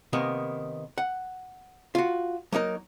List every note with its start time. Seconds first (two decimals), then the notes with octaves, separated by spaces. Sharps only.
0.13 C3 D#3 A#3 B3
0.98 F#5
1.95 F4 F#4
2.52 F#3 A#3 D#4 A#4